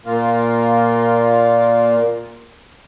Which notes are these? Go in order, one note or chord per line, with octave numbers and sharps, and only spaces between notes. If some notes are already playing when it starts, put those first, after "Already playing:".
A#2 A#3 F4